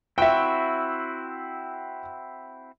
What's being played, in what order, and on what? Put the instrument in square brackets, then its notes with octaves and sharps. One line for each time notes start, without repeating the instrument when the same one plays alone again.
[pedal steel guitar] C4 E4 F#4 [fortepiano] E5 G5